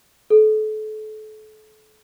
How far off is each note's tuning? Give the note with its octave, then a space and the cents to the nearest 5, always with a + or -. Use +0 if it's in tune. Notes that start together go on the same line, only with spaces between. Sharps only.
A4 -35